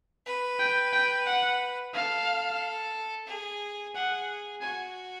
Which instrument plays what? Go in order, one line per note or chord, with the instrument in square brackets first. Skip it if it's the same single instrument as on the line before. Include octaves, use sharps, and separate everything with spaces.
[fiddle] B4
[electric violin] G5
G5
F#5
[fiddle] A4 [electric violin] F5
[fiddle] G#4
[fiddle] G#4 [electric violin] F#5
[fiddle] F#4 [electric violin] G#5